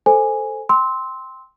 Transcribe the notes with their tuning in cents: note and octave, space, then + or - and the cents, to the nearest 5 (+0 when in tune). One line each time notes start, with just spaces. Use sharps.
A4 +0 C5 +0 G#5 -5
G5 +0 C6 +0 E6 -30